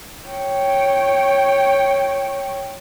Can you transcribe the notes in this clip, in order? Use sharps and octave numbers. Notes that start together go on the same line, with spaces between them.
C#5 G5